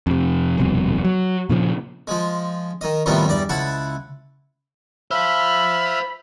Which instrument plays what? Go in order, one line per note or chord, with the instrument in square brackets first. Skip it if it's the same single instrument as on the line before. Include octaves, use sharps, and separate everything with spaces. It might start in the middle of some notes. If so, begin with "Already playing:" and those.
[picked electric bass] F2 C3
D#1 C2 F2 B2
F#3
A#2 C#3 F3
[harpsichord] F3 G#3
D#3 D#5
A2 C3 D#3 F3 G3 B3
E2 G2 D5
C#2 E4 F#5 A5
[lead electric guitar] C5 F5 [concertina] E5 E6 F6 [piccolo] B5